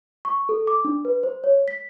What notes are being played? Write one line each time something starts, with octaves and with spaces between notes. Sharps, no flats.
C#6
A4
D6
D4
B4
C5
C#5
B6